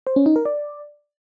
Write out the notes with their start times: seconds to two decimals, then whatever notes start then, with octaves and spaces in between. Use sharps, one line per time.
0.07 C5
0.16 C#4
0.26 D#4
0.36 A#4
0.45 D5